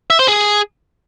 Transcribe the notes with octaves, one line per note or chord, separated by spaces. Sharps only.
E5
C5
G#4